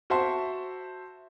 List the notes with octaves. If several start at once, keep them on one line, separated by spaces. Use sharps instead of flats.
F#4 C5 E5 A5 C6